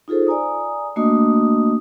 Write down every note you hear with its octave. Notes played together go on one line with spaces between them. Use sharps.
D#4 F4 G#4 A4 C5
D5 G#5 A#5 D#6
A3 A#3 D4 F#4 D#5 D#6